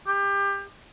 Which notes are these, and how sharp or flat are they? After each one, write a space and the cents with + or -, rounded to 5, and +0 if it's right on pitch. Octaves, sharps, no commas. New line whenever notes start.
G4 +25